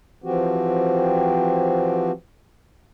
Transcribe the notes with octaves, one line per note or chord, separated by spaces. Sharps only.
E3 F3 C4 F#4 G4